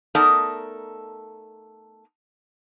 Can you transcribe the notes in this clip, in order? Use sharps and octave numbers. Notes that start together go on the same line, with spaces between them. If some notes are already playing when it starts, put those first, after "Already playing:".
A3 B3 D#4 A4 A#4 D5